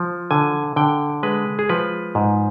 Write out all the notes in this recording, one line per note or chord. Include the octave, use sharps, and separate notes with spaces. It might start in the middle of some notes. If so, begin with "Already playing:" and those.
Already playing: F3
D3 G#5
D3 G5
G#3 B4
G#4
F3 B4
G#2